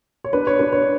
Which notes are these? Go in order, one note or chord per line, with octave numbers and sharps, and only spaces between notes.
C#5
D4 B4
C#5
D4 B4
C#5